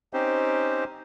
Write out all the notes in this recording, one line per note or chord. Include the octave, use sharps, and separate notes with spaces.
C4 C#4 D#4 G4 C5